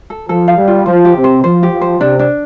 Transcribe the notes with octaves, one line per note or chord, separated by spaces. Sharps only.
A4
F3 A4
F5
G3
F4
F3 C5
G4
C3
C5
F3 C5
G4
F3
C5
C3 D4
D4